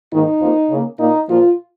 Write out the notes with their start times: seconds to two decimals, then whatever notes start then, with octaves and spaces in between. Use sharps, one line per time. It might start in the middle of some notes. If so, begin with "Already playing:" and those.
0.12 G#2 D#3 A#3 D#4
0.41 F2 F3 A#3
0.70 C#3 A#3
0.99 A#2 A#3 D#4
1.28 A#2 F3 A#3 F4